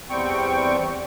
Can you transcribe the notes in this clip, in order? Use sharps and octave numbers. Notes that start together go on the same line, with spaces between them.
E2 G3 C4 G5 C#6